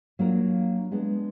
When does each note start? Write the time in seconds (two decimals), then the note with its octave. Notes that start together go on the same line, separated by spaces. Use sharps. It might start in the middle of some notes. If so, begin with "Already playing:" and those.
0.19 F#3 A#3 D4 F4 A#4
0.91 G#3 B3 D4